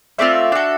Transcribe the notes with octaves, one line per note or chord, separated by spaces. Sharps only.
A3 C4 F4 D5 E5
D4 F#4 A4